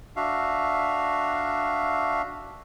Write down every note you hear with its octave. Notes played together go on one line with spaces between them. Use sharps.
D4 F#4 E5 F5